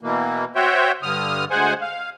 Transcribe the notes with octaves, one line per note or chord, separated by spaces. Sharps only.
B2 E3 A#3
F#4 C5 C#5 E5 G5
G2 D3 D#6 F6
D2 G#3 C5 F#5 G#5
F5